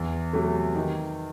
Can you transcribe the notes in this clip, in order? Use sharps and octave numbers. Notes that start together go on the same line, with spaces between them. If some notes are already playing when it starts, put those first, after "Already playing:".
Already playing: E2
C3 F#3 A3
D#3